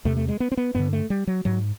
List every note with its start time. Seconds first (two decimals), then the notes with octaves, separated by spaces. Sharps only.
0.05 E2 C3 A3
0.17 A3
0.29 G#3
0.40 B3
0.52 C4
0.57 B3
0.75 G2 D3 B3
0.93 A3
1.10 G3
1.27 F#3
1.45 G#2 F#3